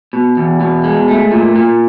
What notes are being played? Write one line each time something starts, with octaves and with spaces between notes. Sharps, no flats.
B2
E2
B2
G#3
A3
A#2
A#2